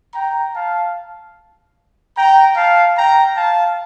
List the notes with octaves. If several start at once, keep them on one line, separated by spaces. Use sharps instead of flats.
G5 A#5
F5 A5
G5 A#5
F5 A5
G5 A#5
F5 A5